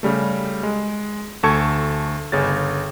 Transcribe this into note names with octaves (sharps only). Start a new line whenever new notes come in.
C#3 G3 A3
G#3
D2 A4 A5 C#6 G#6 C#7
G1 C#3 C#4 A6